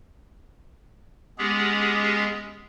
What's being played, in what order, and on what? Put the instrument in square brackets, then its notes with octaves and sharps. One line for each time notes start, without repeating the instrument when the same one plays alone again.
[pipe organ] G#3 B3 C#4 G4 G#4